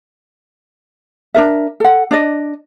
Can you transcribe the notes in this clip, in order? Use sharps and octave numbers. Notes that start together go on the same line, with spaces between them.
D4 D#4 A#4 E5
A4 F#5
D4 D5 D#5